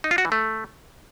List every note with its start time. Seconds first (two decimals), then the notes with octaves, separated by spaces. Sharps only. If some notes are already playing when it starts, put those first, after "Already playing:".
0.04 D#4
0.11 F4
0.18 F#4
0.25 E3
0.32 A3